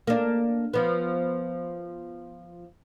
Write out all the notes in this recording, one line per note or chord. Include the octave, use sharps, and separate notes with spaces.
A#3 D4
F3 B3